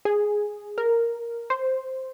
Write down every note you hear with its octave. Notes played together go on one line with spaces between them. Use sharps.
G#4
A#4
C5